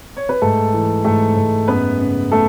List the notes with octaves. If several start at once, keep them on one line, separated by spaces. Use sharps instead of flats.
C#5
B4
G#2 A3 A4
E3
G#2 A3 A4
G#2
F#2 B3 B4
C#3
A3 A4